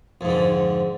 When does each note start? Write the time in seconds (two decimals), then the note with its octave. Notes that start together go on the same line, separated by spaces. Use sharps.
0.21 F2
0.25 G#2
0.29 D3